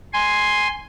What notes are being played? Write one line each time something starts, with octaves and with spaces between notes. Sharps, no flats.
G#5 C6